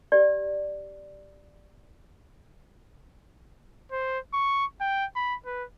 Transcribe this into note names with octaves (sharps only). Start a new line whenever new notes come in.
G4 D5
C5
C#6
G5
B5
B4